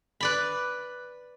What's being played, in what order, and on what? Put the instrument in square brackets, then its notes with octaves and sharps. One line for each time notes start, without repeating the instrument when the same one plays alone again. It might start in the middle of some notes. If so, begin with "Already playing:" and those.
[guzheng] B4 D5 B5